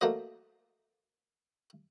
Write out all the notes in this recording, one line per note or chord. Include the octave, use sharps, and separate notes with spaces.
A3 A#3 F#4 C5 D#5